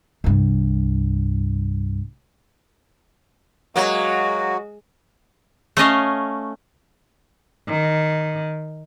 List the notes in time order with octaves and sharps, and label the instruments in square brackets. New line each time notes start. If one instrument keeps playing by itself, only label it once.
[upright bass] C2 G2
[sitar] F#3 A#3 [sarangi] G#3 [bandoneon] F#4
[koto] A3 C#4 D#5 F5
[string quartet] D#3